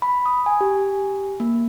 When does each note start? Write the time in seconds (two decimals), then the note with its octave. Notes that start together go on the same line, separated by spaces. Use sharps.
0.02 B5
0.26 D#6
0.46 G#5
0.61 G4
1.40 A#3